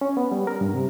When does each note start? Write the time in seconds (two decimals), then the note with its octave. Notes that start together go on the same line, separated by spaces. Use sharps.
0.01 C#4
0.17 B3
0.32 G3
0.47 A#4
0.61 G2
0.74 C3